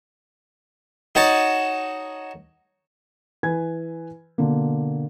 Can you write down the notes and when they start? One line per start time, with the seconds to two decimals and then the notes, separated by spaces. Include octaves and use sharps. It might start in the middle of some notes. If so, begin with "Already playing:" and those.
1.15 D#4 F#4 C#5 A5
3.43 E3 B4 G#5 G#6
4.38 B2 D3 A#3